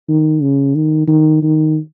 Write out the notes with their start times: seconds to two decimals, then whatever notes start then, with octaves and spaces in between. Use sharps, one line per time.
0.09 D#3
0.42 C#3
0.75 D#3
1.08 D#3
1.42 D#3